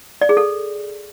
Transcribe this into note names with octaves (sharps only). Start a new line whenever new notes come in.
D5
G#4
A4